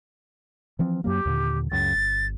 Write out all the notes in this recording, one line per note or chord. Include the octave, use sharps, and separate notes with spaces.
E3 F3 C4
F#2 F#3 A#3 G4
D#2 A#2 D3
C#2 F#2 C#3 A6
G1